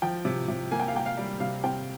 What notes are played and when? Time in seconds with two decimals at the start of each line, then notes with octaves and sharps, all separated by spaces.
0.02 F3 G5
0.25 C3
0.48 C3
0.71 A#3 G#5
0.80 G5
0.88 F5
0.95 A#3 G5
1.06 F5
1.17 G3
1.40 C3 F5
1.64 C4 G5